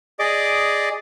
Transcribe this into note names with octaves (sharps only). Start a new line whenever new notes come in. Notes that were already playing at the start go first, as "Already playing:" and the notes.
G#4 D5 D#5 D6